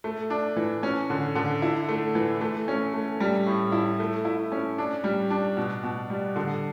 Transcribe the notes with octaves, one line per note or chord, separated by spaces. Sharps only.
A3
D4
E3
C#4
D3
D3
E4
A3
E3
A3
C#4
A3
G3
A2
E4
A3
E4
C#4
D4
G3
D4
B2
B2
G3
D3